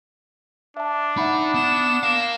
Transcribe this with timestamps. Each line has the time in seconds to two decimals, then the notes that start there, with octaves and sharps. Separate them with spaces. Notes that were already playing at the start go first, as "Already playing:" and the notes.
0.77 D4 E5 A5
1.17 D#4 E5 F#5 B5
1.54 B3 E7
2.03 A#4 F5